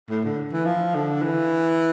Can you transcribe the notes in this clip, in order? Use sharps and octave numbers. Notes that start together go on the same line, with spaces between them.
A2
D3
E3
F3
D3
E3